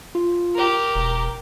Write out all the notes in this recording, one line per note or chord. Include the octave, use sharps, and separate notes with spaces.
F4
G4 A#4
E1